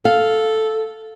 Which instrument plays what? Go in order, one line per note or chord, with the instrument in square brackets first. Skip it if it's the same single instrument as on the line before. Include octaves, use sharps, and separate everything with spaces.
[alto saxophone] A4 [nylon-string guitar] F5